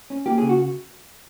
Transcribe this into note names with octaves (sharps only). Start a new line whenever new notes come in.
C#4
A#3 G4
G#4
C#3
F#4